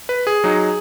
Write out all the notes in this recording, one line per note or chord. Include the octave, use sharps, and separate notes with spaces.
B4
G#4
F#3 D#4